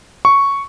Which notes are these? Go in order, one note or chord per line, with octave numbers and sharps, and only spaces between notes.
C#6